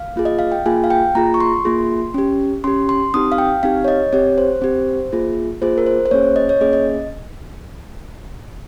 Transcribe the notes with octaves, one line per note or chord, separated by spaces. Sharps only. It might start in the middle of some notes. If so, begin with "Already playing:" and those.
Already playing: F5
A#3 F4 G#4
D#5
F5
G5
A#3 F4 G#4 G#5
F5
G5
A#3 F4 G#4 A#5
C#6
C6
A#3 F4 G#4
C#4 G4
C#4 G4 C6
C6
C4 D#4 G4 D#6
F5
G5
C4 D#4 G4 F5
C#5
D#5
C4 G4 C#5
C5
C4 G4
A#3 F4 G#4
A#3 F4 G#4 C5
A#4
C5
C5
A#3 C#4 G#4 C#5
D#5
C#5
A#3 C#4 G#4 D#5
D#5